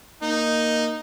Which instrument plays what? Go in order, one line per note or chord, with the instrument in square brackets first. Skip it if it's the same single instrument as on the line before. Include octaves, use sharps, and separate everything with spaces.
[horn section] A#3 D#4